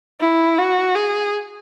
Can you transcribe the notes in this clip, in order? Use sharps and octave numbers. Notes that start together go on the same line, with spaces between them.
E4
F#4
G#4